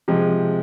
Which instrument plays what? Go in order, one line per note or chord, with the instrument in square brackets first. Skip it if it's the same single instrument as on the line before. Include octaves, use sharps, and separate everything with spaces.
[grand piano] C3 F3 G#3